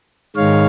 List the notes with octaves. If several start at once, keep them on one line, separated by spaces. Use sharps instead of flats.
G#2 D#3 G#3 C#5 F5